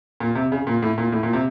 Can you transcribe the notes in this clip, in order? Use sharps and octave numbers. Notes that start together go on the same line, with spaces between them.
A#2
C3
C#3
A#2
A2
A#2
A2
A#2
C3